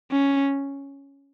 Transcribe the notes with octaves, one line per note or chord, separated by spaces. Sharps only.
C#4